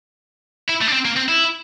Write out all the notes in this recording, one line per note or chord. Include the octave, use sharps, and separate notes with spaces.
E4
A3
D4
C4
A#3
C4
E4